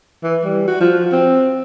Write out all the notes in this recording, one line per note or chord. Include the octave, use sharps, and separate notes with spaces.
E3
G3
F#4
F3
C4